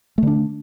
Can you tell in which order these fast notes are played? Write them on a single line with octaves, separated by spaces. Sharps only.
A3 D3 D4